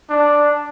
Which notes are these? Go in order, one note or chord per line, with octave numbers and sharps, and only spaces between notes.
D4